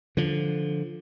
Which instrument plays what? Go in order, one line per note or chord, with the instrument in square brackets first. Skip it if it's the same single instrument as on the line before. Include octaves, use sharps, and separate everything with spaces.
[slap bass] D3 F3